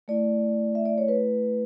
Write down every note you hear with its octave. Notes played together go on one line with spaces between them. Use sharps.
A3 E4 D5
E5
D5
C#5
B4